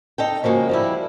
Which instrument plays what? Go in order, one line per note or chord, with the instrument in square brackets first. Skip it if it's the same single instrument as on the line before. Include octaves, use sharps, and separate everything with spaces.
[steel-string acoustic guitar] D#4 A4 G5
C#3 F3 G#3 A#3 F#4
F3 G3 E4